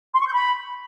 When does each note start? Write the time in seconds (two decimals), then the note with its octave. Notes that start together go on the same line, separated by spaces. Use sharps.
0.13 C6
0.20 C#6
0.26 G6
0.33 B5